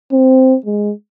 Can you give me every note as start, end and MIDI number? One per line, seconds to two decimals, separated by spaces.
0.12 0.56 60
0.66 0.92 56